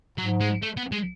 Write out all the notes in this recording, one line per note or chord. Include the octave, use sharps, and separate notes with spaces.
G#2 F#3
G#3
A3
B3
G#3